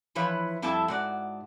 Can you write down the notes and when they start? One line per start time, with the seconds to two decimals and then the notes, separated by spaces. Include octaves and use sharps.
0.15 E3 F3 E4 B4 C#5
0.62 F2 G3 E4 A4 E5 A5
0.88 G#2 F#4 D5